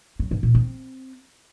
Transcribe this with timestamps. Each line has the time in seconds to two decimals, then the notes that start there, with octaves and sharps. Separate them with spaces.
0.19 F#3
0.31 G#2
0.43 A#2
0.55 C4